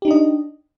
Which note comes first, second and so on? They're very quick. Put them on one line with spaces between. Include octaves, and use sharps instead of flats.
G4 D#4 D4 D#5